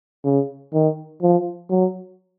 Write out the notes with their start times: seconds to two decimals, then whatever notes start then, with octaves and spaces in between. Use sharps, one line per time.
0.25 C#3
0.73 D#3
1.22 F3
1.70 F#3